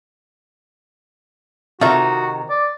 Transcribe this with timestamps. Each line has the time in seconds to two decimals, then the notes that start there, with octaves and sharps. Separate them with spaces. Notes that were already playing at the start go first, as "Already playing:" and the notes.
1.81 C3 D#3 D#4 F4 F#4 A4 E5
2.50 D5